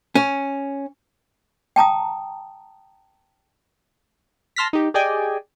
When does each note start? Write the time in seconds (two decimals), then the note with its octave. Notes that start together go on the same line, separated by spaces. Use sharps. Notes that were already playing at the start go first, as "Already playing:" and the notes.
0.15 C#4
1.76 G5 A5 A#5 D#6
4.56 A5 C6 F6 A#6 B6
4.73 D#4 G4
4.94 G4 G#4 D5 D#5 G5 G#5